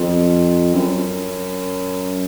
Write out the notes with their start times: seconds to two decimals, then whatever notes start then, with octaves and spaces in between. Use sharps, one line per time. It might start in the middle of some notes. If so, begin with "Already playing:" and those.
Already playing: F2
0.74 F#2